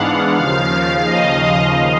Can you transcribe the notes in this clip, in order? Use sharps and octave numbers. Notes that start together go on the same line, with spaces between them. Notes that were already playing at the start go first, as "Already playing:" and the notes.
Already playing: G#2 E3 G#3 B3 D4 F5 F#5
D#2 C#3 F3 F5
F5
D#5